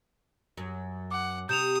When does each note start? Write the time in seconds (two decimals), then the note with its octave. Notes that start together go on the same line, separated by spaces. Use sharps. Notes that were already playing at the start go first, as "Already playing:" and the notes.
0.57 F#2
1.11 F#5 D6
1.49 C3 D#6 G6 E7 F7